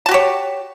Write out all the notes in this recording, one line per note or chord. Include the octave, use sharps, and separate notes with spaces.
F#4 G4 C#5 A5